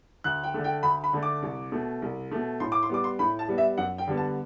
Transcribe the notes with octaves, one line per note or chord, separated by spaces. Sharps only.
D2 F#6
G5
D3 A3
G5
D2 B5
B5
D3 A3
D6
C2
B2 A3
C2
B2 A3
A2 C6
D6
C6
G3 B3 D6
C6
A2 B5
A5
G3 B3
E5
F#2 F#5
G5
D3 G3 B3
A5